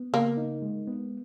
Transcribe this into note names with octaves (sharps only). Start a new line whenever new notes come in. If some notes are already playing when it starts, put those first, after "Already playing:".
Already playing: B3
C#3 A#3
D#4
G#3
B3